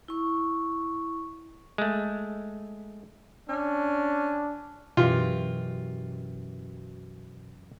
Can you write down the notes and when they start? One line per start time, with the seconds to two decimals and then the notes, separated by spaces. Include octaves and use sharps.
0.08 E4 C#6
1.78 G#3 A3
3.49 C#4 D4
4.97 F#2 B2 E3 F4 G4